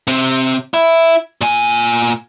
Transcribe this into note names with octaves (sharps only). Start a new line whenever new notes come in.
C3 C4
E4
A#2 G#5